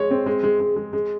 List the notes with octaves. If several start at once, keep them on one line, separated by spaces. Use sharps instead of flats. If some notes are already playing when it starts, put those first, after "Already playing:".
Already playing: G#3 C#5
C4
G#3
G#3
G#3
G#3
G#3